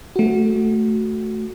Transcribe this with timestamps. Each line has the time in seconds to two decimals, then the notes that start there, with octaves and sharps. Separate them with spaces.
0.16 A3 F#4